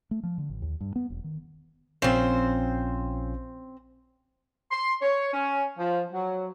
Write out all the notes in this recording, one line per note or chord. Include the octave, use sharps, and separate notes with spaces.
A3
F3
D3
A1
D#2
G2
B3
E1
D#3
A#1 C4 C#4 F4 C5
C6
C#5
C#4
F3
F#3